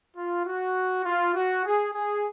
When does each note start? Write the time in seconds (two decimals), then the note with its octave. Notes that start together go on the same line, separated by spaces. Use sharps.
0.16 F4
0.45 F#4
1.05 F4
1.34 F#4
1.65 G#4
1.94 G#4